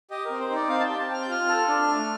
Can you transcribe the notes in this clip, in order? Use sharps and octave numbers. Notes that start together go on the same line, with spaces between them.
G4 D#5
A#4
C4
C5
D#4 D5
C4 F5
A5
G4 G5
A5
C4 F6
G6
F4 F6
A4
D4
A3